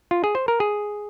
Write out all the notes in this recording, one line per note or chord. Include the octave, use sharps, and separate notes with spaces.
F4
G#4
C5
A#4
G#4